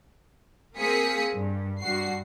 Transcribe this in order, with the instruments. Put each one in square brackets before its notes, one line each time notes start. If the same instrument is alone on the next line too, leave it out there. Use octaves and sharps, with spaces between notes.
[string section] A#3 C4 G#4 D#6 B6 C#7
G2
G2 F#4 C7